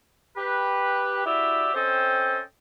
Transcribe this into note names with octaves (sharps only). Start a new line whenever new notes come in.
G4 B4
E4 F#4 G4 D5 E5
C4 C#4 A4 C5 D#5 G5